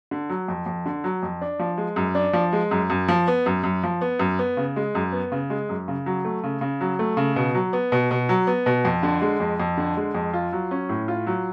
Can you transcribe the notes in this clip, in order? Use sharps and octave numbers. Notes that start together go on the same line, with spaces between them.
D3
F#3
F2
F2
D3
F#3
F2
D4
F3
G#3
F#2
D4
F3
G#3
F#2
F#2
F3
B3
F#2
F#2
F3
B3
F#2
B3
C#3
G#3
F#2
B3
C#3
G#3
F#2
C#3
F#3
A3
C#3
C#3
F#3
A3
C#3
B2
F#3
B3
B2
B2
F#3
B3
B2
F2
D3
G#3
F2
F2
D3
G#3
F2
F4
F#3
C#4
A2
F4
F#3